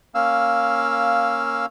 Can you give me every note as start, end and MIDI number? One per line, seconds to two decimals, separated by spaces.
0.15 1.66 58
0.15 1.66 61
0.15 1.66 77
0.15 1.66 88